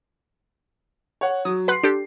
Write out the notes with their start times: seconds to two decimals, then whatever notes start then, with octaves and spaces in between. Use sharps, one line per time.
1.21 C#5 F#5
1.45 F#3 D#6
1.68 B4 F#5 C6 F#6 C7
1.83 D4 G4 A4